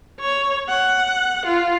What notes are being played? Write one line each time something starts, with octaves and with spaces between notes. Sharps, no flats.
C#5
F#5
F4